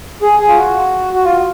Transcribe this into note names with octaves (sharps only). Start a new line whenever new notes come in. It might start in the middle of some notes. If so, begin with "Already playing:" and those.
G#4
G#4
F4
F#4
F#4
F4